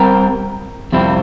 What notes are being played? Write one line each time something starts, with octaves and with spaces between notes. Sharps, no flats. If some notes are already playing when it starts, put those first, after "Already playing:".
Already playing: G3 C4 G4 A#4
F2 C3 G3 C4 E4